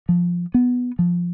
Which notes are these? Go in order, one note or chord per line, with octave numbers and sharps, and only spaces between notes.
F3
B3
F3